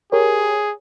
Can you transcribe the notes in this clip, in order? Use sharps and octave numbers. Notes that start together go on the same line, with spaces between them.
G4 G#4 A#4 C#5